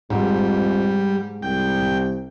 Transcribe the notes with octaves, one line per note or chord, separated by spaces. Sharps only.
F2 G#2 G3
C2 G5